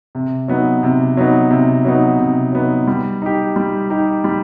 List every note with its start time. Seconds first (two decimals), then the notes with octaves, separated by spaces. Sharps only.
0.15 C3
0.48 F#3 B3 D#4
0.83 C3
1.17 F#3 B3 D#4
1.50 C3
1.85 F#3 B3 D#4
2.20 C3
2.53 F#3 B3 D#4
2.87 G3
3.22 D#4 G4
3.56 G3
3.90 D#4 G4
4.24 G3